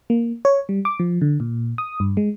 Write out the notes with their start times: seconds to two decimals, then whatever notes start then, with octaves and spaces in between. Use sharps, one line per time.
0.10 A#3
0.45 C#5
0.69 G3
0.85 D6
0.99 F3
1.22 D3
1.40 A#2
1.78 D#6
2.00 G2
2.17 G#3